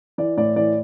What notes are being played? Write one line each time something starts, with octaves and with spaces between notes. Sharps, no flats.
E3 D5
A2 D5
E3 D5